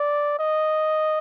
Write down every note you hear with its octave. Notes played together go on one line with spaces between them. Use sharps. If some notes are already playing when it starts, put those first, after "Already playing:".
Already playing: D5
D#5